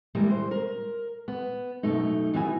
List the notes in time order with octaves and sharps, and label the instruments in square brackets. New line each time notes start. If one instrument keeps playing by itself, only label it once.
[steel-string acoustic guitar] E3 G3 G#3 A#3
C5
A#4
B3
F#2 B2 A3 D#4
E3 G3 B3 F#4 E5 G#5